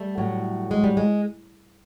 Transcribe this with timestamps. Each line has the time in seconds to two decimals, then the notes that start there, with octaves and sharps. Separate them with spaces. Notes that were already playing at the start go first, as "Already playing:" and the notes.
Already playing: G3 A3
0.18 A2 F#3
0.71 G#3
0.84 G3
0.97 G#3